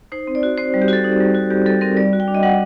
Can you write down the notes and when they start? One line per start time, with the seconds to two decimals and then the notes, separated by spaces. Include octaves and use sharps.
0.12 D#4 C5
0.27 C4
0.35 D5
0.43 F#4
0.58 C4 C5
0.74 G3
0.82 G4
0.88 F#4 A4
1.04 D#4
1.20 G3
1.35 F#4
1.51 G3 G4
1.66 G3 A4
1.81 C4 A#4
1.97 G3 D5
2.13 F#4
2.20 G5
2.28 D4
2.35 D#5
2.43 G3 F#5